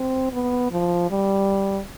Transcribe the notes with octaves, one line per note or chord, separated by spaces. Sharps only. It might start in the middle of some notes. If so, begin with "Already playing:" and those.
Already playing: C4
B3
F3
G3